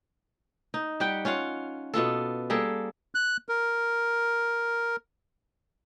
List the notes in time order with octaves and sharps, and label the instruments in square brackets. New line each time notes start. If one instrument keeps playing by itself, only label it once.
[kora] D#4
G3 G4 F#5 G5
C#4 F4 F5 F#5
B2 B3 F4 A4
G3 A#3 G#4 A4
[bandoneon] F#6
A#4